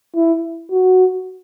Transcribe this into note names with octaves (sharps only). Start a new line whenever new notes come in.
E4
F#4